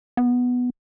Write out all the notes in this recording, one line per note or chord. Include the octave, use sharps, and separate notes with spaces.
B3